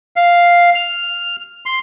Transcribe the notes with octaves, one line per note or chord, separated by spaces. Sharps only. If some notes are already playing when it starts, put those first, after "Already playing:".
F5
F6
C6